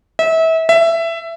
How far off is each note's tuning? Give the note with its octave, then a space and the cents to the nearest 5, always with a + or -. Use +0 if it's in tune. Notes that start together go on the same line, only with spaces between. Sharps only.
E5 -30
E5 +15